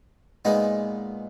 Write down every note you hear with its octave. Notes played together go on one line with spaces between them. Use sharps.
A#2 G#3 B3 D#4